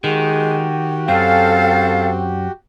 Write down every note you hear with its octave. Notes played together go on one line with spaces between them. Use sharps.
D#3 G#3 F#4 G4
F#2 C4 A4 F5